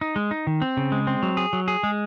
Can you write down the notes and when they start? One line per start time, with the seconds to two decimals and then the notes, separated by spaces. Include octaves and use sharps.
0.01 D#4
0.16 G#3
0.31 D#4
0.47 D#3
0.62 C4
0.77 C#3
0.92 G#3
1.07 C4
1.23 F#3
1.37 G#4
1.53 F#3
1.68 G#4
1.83 G#3